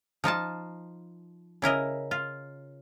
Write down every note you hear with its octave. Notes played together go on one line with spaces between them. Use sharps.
F3 D#4 F4 A5
C#3 E4 A#4 D#5
F4